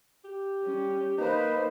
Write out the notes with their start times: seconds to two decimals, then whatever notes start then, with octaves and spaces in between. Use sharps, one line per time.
0.24 G4
0.63 G3 C#4
1.18 A#3 D#4 B4 C5